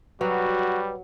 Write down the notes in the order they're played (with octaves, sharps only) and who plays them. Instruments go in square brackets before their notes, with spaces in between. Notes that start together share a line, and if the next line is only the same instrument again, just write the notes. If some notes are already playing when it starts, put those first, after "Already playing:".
[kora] F#3 [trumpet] G3 [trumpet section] F#4 [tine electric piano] B4